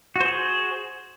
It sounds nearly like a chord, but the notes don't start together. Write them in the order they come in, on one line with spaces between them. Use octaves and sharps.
F#4 C5 G#4